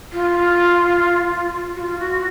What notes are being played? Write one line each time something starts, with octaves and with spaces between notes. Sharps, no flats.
F4
F#4
F4
F#4